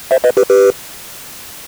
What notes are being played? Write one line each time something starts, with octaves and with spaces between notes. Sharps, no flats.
C5 E5
B4 D#5
G4 B4
G4 B4